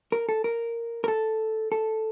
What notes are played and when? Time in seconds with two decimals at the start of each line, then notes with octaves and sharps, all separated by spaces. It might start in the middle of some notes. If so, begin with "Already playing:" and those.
0.12 A#4
0.29 A4
0.44 A#4
1.04 A#4
1.08 A4
1.72 A4